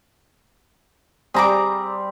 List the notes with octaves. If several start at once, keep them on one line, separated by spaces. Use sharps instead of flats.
G3 C4 G#4 A#5 D6